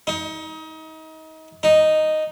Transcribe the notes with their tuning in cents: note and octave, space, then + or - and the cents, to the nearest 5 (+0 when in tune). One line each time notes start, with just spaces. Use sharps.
D#4 +30
D#4 -5